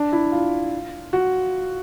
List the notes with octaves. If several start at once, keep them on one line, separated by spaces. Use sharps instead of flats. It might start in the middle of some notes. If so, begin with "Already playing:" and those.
Already playing: D4
E4
F4
F#4